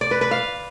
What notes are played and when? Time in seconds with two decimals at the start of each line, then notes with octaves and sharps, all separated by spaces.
0.01 D5
0.11 B4
0.21 B4
0.31 F5